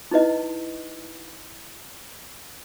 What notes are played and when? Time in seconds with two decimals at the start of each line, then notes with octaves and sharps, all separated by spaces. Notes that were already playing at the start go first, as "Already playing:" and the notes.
0.11 D#4 E4 B4 D#5